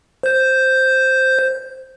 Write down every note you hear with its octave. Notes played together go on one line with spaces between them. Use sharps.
C5 G6